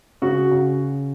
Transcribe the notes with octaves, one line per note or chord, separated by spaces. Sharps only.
C#3 F#4
C#3